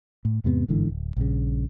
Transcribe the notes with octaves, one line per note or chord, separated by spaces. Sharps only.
A2
E2 G#2 C3 B3
G1 G#2 D3 E3
D1
A#1 G2 C#3